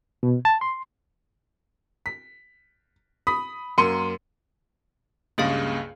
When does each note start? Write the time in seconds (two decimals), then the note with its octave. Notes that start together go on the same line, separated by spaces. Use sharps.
0.23 B2
0.45 A5
0.61 C6
2.06 B6
3.27 B5 D#6 B6
3.78 F#2 A#3 A#4 C6 C#7 D#7
5.38 C#2 G2 C#3 A#3 G#4 F5